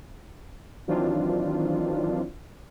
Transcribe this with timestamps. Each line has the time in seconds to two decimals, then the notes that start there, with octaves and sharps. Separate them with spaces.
0.88 D#3 E3 F#3 C4 D4 F4